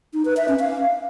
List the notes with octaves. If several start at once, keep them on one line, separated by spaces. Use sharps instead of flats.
D#4
B4
E5
C#4
F5